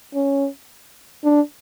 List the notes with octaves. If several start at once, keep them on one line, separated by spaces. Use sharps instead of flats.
C#4
D4